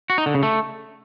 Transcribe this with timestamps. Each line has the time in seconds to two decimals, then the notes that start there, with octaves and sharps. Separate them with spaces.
0.10 F#4
0.18 D#4
0.26 D3
0.34 C#3
0.43 A3